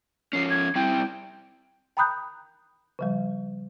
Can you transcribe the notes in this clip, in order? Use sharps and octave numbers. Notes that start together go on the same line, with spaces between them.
F3 C#4 C7
G#6
G3 C4 E4 G5
G5 A#5 B5 D#6 F#6 G6
C#3 F3 G3